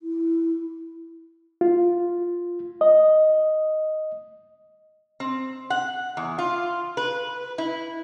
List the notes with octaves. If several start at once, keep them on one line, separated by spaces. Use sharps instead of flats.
E4
F4
D#5
C4
F#5
E2
F4
B4
E4